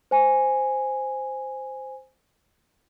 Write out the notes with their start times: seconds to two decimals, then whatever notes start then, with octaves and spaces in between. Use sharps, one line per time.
0.11 C5 G#5